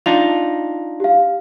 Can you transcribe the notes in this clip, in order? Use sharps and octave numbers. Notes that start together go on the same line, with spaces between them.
D4 D#4 F4 F7
G4 F5